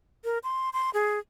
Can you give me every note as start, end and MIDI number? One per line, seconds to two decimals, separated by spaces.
0.24 0.38 70
0.44 0.69 84
0.73 0.90 84
0.94 1.19 68